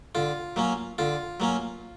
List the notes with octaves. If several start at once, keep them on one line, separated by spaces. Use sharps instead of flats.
D3 F4
F#3 A#3 C#4
D3 F4
F#3 A#3 C#4